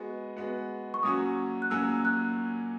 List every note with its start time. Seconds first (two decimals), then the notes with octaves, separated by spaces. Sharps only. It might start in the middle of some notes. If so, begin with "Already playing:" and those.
Already playing: G#3 B3 F#4
0.37 G#3 B3 F#4
0.94 C#6
1.03 A#2 F#3 C#4 F#4 D#6
1.62 F#6
1.70 A#2 F#3 C#4 F#4 E6
2.05 F#6